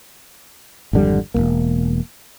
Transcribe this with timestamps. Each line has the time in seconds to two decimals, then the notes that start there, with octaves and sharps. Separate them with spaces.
0.93 G#1 F2 D3 G3
1.34 E1 F#2 A#3